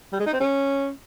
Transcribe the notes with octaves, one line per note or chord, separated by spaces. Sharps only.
G3
G#3
D#4
C4
C#4